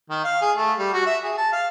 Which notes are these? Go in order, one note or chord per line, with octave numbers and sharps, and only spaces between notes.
D#3
F5
G#4
A3
G3
F#4
E5
G#4
A5
F5